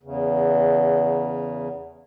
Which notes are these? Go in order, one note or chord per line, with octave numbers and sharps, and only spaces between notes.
E2 C#3